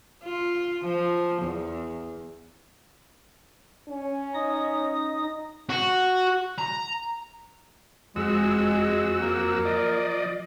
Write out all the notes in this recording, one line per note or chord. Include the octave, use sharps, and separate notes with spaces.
F4
F3
E2
C#4
D#4 D#5 D#6
F#4
A#5
F2 G#3 F#4 E6
A#3
F3 D5 D#5